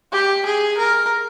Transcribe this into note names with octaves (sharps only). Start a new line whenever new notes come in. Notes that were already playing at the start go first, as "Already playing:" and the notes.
G4
G#4
A#4